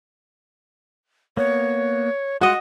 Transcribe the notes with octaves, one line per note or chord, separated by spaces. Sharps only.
A#3 B3 C#5
G#3 F4 F#4 D#5 F#5